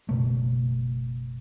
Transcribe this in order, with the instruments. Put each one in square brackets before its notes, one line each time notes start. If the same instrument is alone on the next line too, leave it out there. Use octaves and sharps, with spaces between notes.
[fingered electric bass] F#1 B2 A3